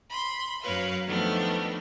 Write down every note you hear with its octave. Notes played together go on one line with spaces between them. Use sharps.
B5 C6
F#2 A#4 B4 C#5 F5
D#3 F3 A3 B3 D4